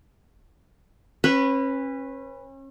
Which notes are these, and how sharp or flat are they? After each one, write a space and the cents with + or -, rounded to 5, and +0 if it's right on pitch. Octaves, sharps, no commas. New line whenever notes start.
C#4 -35 B4 +0